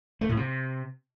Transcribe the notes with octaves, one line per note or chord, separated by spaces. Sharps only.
A3
A2
C3